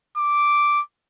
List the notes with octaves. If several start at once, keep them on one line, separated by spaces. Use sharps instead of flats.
D6